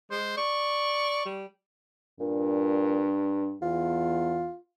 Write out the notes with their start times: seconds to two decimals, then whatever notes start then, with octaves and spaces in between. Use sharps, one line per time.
0.11 G#3 C5
0.37 D5 C#6
1.26 G3
2.20 G2 A#2
3.62 E2 F4